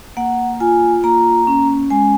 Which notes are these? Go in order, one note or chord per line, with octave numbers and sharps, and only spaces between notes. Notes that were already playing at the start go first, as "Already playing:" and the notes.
A#3 F#5
F4 G#5
A#3 A#5
C#4
G#3 G#5